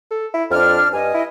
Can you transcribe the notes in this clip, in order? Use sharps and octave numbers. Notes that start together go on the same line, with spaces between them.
A4
E4
F2 D4 F6
G2 D#5 G#5
E4